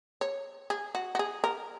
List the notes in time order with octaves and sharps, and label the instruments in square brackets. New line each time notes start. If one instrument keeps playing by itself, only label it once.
[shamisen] C#5
G#4
F#4
F#4
G#4
A#4